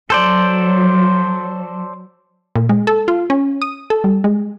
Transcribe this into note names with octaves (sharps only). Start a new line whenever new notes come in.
F#3 A4 C5 D5
A#2
G#3
A4
F4
C#4
D#6
A4
G3
G#3